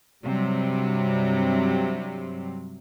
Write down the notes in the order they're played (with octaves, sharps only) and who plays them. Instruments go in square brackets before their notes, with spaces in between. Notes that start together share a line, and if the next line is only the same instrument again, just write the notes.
[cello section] G2 C3 F#3 G3